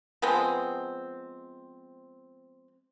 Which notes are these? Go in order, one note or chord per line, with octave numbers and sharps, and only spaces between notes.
F3 G#3 B3 C4